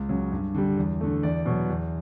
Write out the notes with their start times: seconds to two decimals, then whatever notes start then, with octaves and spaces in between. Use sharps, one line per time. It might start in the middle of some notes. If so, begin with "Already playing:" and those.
Already playing: C#2
0.09 C#3 F#3
0.32 G2
0.55 D3 G3
0.77 E2
1.00 D3 A3
1.23 E2 D5
1.46 B2 F#3
1.69 E2